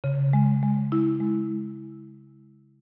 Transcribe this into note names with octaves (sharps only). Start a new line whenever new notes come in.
C#3
G#3
G#3
E4
G#3